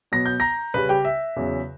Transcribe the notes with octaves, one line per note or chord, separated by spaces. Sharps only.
B2 F#3 B3 A#6
G6
A#5 A#6
C#3 G3 C#4 B4 B5
G4 G5
E5
E2 C#3 F#3